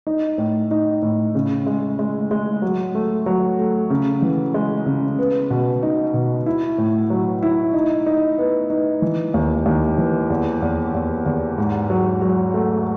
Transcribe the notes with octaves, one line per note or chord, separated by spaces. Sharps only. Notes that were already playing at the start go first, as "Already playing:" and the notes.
D#4
A2
D#4
A2
C#3
G#3
G#3
G#3
F#3
A3
F#3
A3
C#3
E3
G#3
C#3
B3
B2
D#4
B2
E4
A2
F#3
E4
D#4
D#4
B3
D#4
E3
D#2
D#2
E3
E2
E2
E2
E2
G#2
F#3
F#3
A3